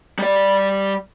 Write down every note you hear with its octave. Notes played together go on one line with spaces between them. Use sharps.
G3 D5